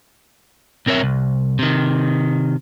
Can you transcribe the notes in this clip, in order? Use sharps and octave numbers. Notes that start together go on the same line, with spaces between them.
B1 C4 A#4 C#5 E5
C2
C3 D#3